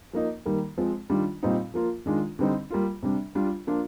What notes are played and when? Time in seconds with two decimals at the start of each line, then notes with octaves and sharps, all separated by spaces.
0.13 F3 A#3 D#4
0.46 D#3 G3 A#3
0.78 F3 G#3 C4
1.10 D#3 G3 D4 F4
1.43 A#2 G3 C4 D#4
1.74 F3 A#3 F4
2.06 D#3 G#3 D4 F4
2.39 D3 G3 C4 D#4
2.71 G3 A#3 F4
3.03 C3 G3 D4
3.35 G3 D4 F4
3.67 F3 A#3 D4 F4